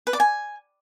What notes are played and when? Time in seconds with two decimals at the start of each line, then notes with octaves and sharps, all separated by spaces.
0.07 B4
0.13 D5
0.20 G#5